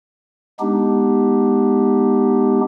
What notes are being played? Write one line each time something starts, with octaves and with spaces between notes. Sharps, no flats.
G#3 B3 D4 D#4 G4